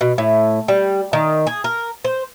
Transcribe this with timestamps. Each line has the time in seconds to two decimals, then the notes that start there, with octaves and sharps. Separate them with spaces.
0.01 B2
0.18 A2
0.68 G3
1.13 D#3
1.47 G#4
1.64 A#4
2.05 C5